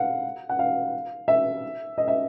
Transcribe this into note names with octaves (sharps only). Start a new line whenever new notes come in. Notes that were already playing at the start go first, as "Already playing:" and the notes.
Already playing: F5 F#5
F#5
F5
E5
D#5
E5